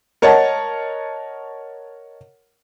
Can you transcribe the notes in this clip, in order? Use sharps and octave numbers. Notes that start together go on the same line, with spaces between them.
A#4 C#5 D#5 F#5 A5